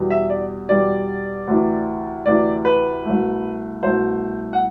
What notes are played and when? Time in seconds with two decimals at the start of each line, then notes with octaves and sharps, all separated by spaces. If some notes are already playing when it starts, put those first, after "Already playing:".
Already playing: E2 B2 G3
0.10 E5
0.30 D5
0.69 E2 B2 G3 D5
1.47 D2 C3 E3
2.26 D2 C3 E3 D5
2.65 B4
3.05 C2 B2 A3
3.83 C2 B2 A3 C5
4.53 F#5